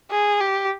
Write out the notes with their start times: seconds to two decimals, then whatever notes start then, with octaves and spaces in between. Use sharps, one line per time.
0.11 G#4
0.40 G4